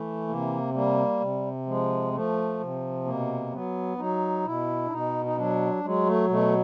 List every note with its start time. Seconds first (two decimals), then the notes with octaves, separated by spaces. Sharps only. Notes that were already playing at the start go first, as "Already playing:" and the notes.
Already playing: E3 A3
0.28 C3 A#3
0.74 G3 A#3
1.20 C3
1.66 F3 G#3
2.14 F3 A3
2.60 C3
3.05 B2 A#3
3.52 F#3 B3
3.98 F#3 D#4
4.45 B2 E4
4.86 D4
4.91 B2 D#4
5.25 D#4
5.37 F#3 D4
5.84 F#3 G#3
6.06 A3
6.29 B2 A3